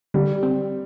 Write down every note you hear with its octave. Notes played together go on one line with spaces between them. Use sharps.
D3 G3
C4